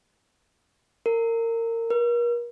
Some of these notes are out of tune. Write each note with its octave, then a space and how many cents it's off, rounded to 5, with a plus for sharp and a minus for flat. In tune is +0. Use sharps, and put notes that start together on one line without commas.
A#4 -25
A#4 +40